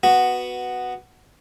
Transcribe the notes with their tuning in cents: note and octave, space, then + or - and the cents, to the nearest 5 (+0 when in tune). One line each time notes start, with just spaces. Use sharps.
B3 +0 F#4 +0